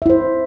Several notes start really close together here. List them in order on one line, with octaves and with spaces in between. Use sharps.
E5 E4 C5